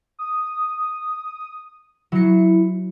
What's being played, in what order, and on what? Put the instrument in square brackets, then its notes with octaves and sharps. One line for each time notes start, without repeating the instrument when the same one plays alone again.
[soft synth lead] D#6
[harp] F#3 C#7 [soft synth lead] E4